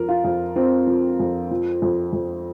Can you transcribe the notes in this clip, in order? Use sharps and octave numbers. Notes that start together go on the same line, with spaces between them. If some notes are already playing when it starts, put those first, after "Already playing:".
Already playing: F2 F3 A#4
F4
F2
F3 C4
F3
F2
F3
F2
F2